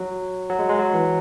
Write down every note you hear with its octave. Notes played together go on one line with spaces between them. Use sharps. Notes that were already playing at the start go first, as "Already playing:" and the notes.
Already playing: F#3
F#3
G#3
G#3
F#3
E3